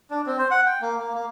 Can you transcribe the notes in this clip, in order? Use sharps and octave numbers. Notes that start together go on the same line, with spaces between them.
D4
C4
C5
F#5
G5
A#3
A#3
A#3